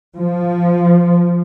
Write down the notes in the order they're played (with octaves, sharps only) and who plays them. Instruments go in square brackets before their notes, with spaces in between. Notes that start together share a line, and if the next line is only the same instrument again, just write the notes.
[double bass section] F3